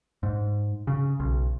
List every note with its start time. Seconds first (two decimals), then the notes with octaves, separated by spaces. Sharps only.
0.23 G#2
0.87 C#3
1.20 B1